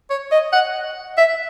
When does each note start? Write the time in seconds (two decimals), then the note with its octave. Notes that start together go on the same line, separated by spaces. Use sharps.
0.10 C#5
0.32 D#5
0.52 F#5
1.17 E5